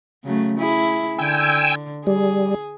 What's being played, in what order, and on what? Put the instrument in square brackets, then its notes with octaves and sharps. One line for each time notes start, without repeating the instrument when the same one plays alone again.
[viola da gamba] C#3 F#3 A3
E4 G#4
[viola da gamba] D3 [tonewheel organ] G5 G#5 E6
[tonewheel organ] G3 [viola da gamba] G#4